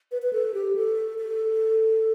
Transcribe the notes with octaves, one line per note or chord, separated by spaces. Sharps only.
B4
B4
A4
G4
A4
A4